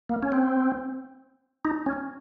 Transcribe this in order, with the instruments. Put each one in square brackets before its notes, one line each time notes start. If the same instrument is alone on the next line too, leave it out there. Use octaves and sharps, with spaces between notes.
[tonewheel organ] A#3
C#4
C4
D#4
C#4